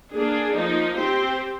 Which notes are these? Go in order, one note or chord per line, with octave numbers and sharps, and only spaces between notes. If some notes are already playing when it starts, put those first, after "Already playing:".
A#3 D4 G#4
F3 A#3 D#4
C4 G4 C5